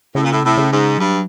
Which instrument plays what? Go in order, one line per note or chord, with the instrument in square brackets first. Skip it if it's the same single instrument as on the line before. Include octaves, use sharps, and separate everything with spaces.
[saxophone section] A2 [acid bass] C#3
[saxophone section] A#2
A2
[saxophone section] A2 [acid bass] C3
[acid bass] C#3
[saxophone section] G#2
[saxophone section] G2 [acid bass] F#3